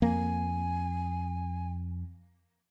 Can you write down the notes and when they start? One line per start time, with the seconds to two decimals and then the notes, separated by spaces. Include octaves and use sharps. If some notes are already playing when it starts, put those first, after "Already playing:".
0.02 F2 A#3 G#5